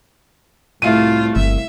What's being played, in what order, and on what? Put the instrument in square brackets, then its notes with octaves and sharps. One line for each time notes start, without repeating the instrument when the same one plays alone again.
[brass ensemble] C2 A2 [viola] A3 F4 [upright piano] E4 F5 D#7
[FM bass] G1 [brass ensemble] C2 [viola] E5